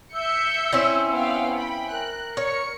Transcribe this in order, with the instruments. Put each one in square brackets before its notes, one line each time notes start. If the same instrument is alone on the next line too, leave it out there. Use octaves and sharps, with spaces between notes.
[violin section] E5 G6 C#7 [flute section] E6
[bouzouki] C4 C#4 E4
[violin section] B3 F5 G5
G5 B5
[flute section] A#4 [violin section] F#6
[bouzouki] C#5 [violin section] C#7